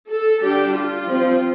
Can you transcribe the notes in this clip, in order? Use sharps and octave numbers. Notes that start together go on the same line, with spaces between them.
A4
D3 G3 D4 G4
F4
F3 C4